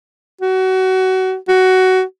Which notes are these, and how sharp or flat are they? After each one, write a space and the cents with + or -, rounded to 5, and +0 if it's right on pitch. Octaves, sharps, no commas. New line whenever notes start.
F#4 +25
F#4 +15